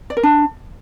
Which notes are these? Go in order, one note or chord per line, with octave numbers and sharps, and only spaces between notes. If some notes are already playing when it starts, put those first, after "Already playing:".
D5
A#4
D4